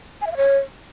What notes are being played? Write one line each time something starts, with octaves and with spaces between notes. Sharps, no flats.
G#5
E5
F5
C#5